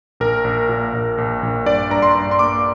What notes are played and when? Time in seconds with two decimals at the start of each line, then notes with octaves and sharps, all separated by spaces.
0.20 A#1 A#4
0.44 A#1
0.69 A#2
0.93 A#1
1.18 A#1
1.43 A#1
1.66 G2 D5
1.90 G2 A#5
2.02 C6
2.15 G2
2.31 C6
2.39 A#3 D6